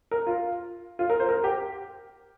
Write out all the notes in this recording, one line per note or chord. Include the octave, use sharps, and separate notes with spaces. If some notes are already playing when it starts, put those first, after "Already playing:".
A#4
F4
F4
A#4
C5
A#4
G4